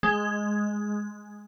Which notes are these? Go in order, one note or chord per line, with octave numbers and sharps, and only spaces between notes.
G#3